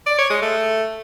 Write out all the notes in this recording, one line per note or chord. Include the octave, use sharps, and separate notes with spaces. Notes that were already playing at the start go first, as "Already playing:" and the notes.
D5
C#5
G#3
A3